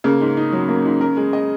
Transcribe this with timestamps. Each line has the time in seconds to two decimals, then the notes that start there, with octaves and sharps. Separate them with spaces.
0.04 C#3 A#3
0.21 G#2
0.37 D#4
0.52 F#3
0.69 A#3
0.85 G#2
1.01 A#4
1.17 G#3
1.33 D#5